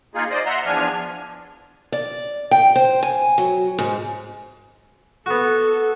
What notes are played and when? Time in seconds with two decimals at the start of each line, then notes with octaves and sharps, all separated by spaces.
0.15 A#3 D#4 F4 G#4
0.31 C5 D5 D#5
0.46 E5 F#5 A#5 C6
0.66 E2 F3 D4 G#5 F6
1.92 D5
2.51 G5
2.76 C5
3.03 G#5
3.38 F#3
3.79 G#2
5.26 B3 F#4 A4